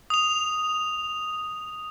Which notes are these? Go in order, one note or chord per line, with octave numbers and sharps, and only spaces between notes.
D#6 F7